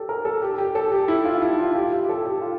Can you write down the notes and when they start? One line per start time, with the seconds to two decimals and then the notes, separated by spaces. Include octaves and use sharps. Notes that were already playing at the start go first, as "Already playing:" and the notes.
Already playing: G4 A4
0.09 A#4
0.25 A4
0.42 G4
0.58 G4
0.75 A4
0.92 G4
1.08 E4
1.25 F4
1.42 E4
1.58 F4
1.75 G4
1.85 F4
1.92 G4
2.05 G4
2.09 A4
2.25 G4
2.42 F4